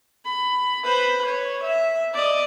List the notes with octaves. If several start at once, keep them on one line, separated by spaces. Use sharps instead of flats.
B5
B4 C5
C#5
E5
D5 D#5